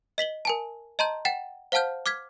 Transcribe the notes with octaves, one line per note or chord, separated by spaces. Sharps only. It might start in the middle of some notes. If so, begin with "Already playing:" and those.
D#5 B6 F#7 G7
A#4 G#5 A5
D#5 A5 A#5 C6 G6
F#5 G5 A6 E7
C5 F5 F#5 A5 F6 G6
D6 F6 G#6 B6